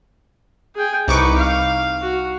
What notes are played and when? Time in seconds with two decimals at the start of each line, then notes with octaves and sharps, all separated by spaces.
0.76 G#4 G5
1.08 C2 D#4 B4 C#6 D6
1.37 F5
2.01 F#4